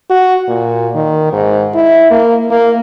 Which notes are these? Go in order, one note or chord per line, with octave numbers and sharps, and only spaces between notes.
F#4
A#2
D#3
G#2
E4
A#3
A#3